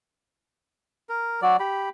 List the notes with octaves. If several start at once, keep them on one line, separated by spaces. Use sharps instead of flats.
A#4
F#3 D5
G4 B5